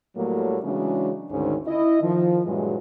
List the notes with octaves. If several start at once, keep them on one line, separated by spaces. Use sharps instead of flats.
A2 F#3 G3 A3 A#3
C#3 E3 F#3 G#3 C#4 D4
D2 G#2 D3 D#3 C#4 D#4
E4 D#5
D#3 F3
G2 A#2 E3 F#3 G#3